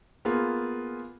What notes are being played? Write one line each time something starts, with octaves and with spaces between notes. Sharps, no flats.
A#3 B3 F4 G#4